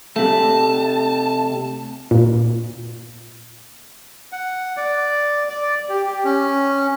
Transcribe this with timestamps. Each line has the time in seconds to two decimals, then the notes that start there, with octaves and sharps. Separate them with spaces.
0.16 C3 A3 A5
2.11 A#2
4.32 F#5
4.77 D5
5.49 D5
5.89 G4
6.06 G4
6.25 C#4